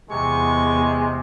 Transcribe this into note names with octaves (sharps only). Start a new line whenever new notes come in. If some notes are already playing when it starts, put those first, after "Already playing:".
E2 C3 G#3 C#6